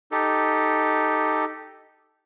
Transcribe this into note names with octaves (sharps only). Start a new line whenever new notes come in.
D#4 G4 A4